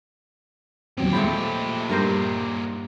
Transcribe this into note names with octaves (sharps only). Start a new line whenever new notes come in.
D#2 A#2 F#3 C4 G4
F3 G#3 A3 B5
G2 A#4 C5